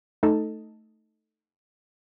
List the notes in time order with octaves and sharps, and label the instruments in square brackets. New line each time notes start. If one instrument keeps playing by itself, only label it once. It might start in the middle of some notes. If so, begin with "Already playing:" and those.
[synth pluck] A3 D#4 A4